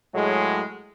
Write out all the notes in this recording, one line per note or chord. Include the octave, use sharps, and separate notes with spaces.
A2 F#3 G#3